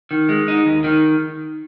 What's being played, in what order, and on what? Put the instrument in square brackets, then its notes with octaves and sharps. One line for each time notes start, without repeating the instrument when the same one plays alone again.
[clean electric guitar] D#3
G#3
D#4
D#2
D#3